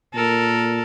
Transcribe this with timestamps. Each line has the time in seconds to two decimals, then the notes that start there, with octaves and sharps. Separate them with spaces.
0.14 A#2 A4 A#4